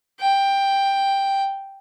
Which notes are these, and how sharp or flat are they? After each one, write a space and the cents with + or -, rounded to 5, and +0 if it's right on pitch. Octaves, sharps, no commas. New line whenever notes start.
G5 +5